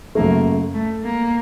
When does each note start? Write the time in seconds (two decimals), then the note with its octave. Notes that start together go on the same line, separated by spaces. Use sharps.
0.15 F#2 C#3 F#3 A3 A#3
0.74 A3
1.04 A#3